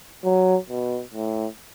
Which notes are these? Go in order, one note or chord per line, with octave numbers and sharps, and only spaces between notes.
F#3
B2
A2